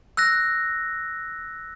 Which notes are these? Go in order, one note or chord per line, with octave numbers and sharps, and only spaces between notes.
E6 F#6 A#6